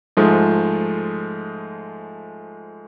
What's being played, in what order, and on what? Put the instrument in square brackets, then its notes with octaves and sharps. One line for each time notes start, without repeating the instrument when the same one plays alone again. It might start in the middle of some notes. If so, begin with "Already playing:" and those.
[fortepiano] G#2 F3 G#3 A3